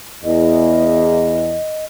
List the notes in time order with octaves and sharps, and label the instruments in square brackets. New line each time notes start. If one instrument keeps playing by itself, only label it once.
[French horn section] E2 [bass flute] D#5